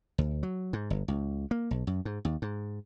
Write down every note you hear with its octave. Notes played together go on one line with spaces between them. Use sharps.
D2
F#3
G#2
G1
C#2
A#3
B1
F#2
G#2
D#2
G#2